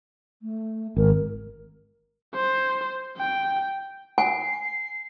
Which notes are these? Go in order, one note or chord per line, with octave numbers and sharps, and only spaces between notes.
A3
G#1 A#4
C5
G5
G#5 C7